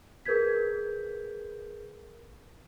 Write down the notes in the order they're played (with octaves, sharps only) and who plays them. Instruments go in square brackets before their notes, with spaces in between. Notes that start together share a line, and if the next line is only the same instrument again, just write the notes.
[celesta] G#4 A#4 B4 G6 G#6 B6